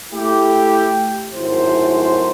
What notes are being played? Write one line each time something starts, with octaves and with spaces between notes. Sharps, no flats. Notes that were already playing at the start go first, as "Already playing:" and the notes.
A3 E4 G4
G#1 F#2 A2 C5